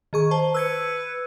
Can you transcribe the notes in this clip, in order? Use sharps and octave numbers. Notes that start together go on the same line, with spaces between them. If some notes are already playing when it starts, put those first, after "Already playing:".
D#3 G#4 C#6
C5 A5
B4 E6 G#6 C#7